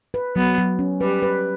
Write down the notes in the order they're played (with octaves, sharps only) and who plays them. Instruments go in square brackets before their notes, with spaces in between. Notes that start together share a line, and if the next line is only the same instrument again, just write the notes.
[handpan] B4
[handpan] F#3 [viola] B3
[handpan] F#3
C#4
[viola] G3 [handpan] B4
[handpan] B4